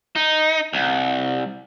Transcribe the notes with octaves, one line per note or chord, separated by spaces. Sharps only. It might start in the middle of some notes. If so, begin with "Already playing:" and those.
D#4
C2